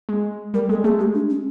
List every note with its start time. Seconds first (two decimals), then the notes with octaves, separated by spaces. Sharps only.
0.09 G#3
0.54 G3 A#4
0.69 G#3 A4
0.84 A3 G#4
0.99 G#3 G4
1.14 D4
1.30 C#4